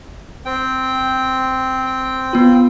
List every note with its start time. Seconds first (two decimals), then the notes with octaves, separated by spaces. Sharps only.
0.46 C4 G5
2.33 B3 F4